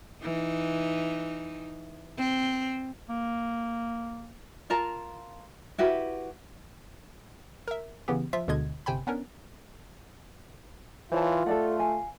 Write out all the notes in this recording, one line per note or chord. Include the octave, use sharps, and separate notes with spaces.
E3 D#4
C4
A#3
F4 A#4 A5 A#5
E4 F#4 G4 B4
A#4 E5
C#3 E3 B3 G4
F3 F4 E5 B6
D2 B2 D3 G#3 D#5 G#6
G1 C3 C5 G5 G#5 B5
B3 C#4 D4 A#4
E3 F4 C5 C#5 A5
A3 A4 D5 F#5
F5 G#5